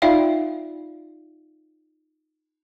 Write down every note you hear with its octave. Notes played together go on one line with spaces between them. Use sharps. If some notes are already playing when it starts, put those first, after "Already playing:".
D#4 F4 D5 E5 F5 G5